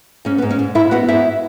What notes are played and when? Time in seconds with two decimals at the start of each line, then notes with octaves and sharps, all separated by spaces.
0.25 G#2 C#4
0.38 B3
0.42 G#2
0.51 C#4
0.59 G#2
0.75 G#2 E4 E5
0.91 B3 F#4 F#5
1.08 G#2 E4 E5